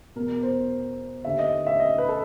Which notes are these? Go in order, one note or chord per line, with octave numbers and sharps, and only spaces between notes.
E2 B2 A#4
C5
D#2 D3 E5
D#5
E5
D#5
B4
A4